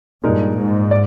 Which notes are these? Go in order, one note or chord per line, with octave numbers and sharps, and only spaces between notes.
G2 A#2 G#3 D#4 A#4
G#2
D5